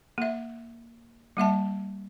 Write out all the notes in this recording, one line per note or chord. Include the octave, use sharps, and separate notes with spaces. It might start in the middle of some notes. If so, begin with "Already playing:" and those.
A#3 E5
G3 A#3 E5 A5